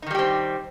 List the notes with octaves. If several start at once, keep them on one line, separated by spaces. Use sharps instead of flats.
D#3 G3 C4 D#4 G4